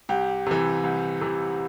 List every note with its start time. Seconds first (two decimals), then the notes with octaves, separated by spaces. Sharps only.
0.09 C2 G4
0.47 C3 E3
0.84 C2
1.21 C3 E3